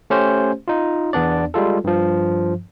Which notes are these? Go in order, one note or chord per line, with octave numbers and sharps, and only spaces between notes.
A3 C#4 G4 C5
D#4 F4
E2 B3 D4 D5
G3 G#3 F4 A4
G2 F3